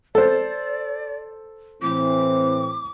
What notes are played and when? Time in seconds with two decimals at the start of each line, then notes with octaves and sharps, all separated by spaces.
0.15 A4 C5 D5
1.82 A2 E3 C4 D6